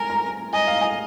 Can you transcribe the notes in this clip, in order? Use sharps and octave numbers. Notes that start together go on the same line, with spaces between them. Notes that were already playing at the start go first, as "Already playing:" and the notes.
Already playing: A#4 G#5
A#5
D#5 G#5
F5
G#5